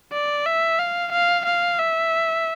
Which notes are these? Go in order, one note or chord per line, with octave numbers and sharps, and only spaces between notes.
D5
E5
F5
F5
F5
E5